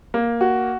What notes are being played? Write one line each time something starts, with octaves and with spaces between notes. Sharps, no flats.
A#3
F#4